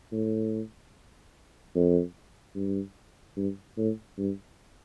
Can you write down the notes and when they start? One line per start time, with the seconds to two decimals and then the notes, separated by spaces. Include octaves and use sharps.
0.12 A2
1.75 F2
2.55 G2
3.37 G2
3.77 A2
4.18 G2